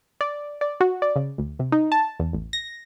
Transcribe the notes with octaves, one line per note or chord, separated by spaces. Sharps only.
D5
D5
F#4
D5
C#3
D2
C3
D#4
A5
E2
A1
A#6